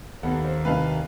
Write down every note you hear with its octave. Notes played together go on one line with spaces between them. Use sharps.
D#2 B3 A4 F#5
C5
C2 D#4 B4 F5 A5